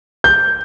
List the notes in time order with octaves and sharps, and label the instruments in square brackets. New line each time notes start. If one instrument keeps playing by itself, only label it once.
[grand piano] G6